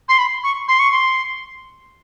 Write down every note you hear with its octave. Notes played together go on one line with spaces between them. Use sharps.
C6
B5
C#6
C6
C#6
C6